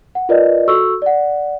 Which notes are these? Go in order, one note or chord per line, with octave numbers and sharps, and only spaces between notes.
F#5
F4 A#4 B4 D5 D#5
F#4 A4 C#6 E6
D5 F#5